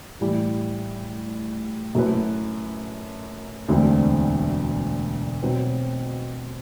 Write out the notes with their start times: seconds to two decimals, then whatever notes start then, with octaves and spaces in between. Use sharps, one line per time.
0.21 A2 E3 G3
1.95 F#2 F#3 A3 E4 B4
3.68 E1 D2 D3 A3 C4
5.42 B2 F#3 C4 F#4 B4